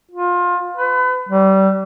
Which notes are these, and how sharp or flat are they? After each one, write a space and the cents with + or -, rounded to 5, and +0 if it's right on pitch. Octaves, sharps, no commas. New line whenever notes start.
F4 +25
B4 +35
G3 -25